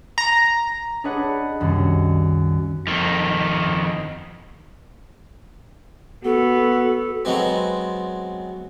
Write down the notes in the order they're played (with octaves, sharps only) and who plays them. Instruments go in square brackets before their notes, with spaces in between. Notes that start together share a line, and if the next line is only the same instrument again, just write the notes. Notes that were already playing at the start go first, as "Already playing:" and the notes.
[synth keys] A#5
[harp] D4 G#4 B4 C#5 D#5 F#5
C2 F#2 D#3 G3
[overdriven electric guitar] F2 D#3
[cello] B3 [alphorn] F#4 [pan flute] A4
[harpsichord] F#3 G#3 B3 C4